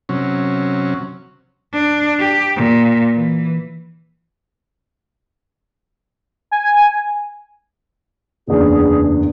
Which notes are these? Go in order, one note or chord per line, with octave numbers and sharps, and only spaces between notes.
C3 F#3 C#4
D4
G4
A#2
E3
G#5
F#1 E2 D4 G#4